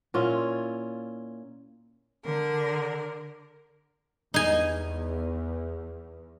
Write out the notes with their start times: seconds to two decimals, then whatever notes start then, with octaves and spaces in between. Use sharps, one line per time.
0.14 A#2 C#4 E4 F4
2.24 D3 A#4
4.34 E2 D#4 G#5